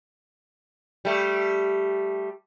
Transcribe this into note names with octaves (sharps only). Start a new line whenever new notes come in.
G3 A3